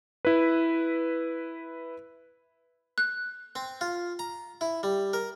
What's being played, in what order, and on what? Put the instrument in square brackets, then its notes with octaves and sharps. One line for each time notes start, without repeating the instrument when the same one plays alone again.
[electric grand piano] E4 B4
[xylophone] F#6
[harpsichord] C4
F4
A#5
E4
G3
A#4